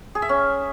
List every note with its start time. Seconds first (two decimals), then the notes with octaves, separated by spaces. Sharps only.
0.15 G#4
0.22 E5
0.29 C#4